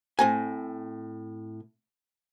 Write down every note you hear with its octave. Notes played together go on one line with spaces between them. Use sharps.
A2 C4 G#5